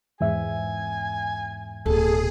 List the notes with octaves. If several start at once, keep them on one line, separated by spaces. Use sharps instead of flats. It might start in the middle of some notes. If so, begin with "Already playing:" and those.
E2 G#2 E5 G#5
D1 B2 G#4 A4